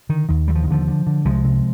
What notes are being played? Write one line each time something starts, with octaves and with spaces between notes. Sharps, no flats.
D3 D#3
D#2 D#3
D#2 G3
F3
D#3
D#2 D3 F3
D3
D3
C2 F3 G#3
C3